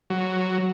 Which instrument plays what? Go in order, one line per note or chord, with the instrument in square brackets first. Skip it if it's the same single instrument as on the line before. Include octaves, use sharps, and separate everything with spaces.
[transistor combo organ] F#3